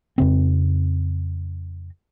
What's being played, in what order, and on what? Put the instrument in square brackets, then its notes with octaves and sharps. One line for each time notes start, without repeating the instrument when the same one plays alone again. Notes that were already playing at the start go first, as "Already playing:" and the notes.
[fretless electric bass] F2 C#3 C4